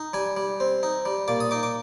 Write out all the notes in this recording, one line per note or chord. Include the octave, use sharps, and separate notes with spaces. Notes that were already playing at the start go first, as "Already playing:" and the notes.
Already playing: D#4
G3 G#5
G3
C4
D#4
G3
A#2 D6
D#6
D#4 D6
D6